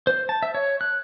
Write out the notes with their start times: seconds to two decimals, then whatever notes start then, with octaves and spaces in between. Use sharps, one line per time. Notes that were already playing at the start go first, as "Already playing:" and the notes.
0.07 C5
0.29 A5
0.42 E5
0.55 C#5
0.81 F#6